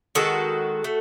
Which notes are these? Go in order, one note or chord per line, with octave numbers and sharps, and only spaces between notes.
D#3 G#3 F#4 A4
A3